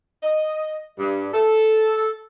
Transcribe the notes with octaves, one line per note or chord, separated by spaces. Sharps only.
D#5
G2
A4